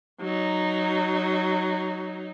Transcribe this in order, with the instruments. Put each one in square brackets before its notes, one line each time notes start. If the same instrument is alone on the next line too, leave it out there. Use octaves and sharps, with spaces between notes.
[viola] F#3 D#4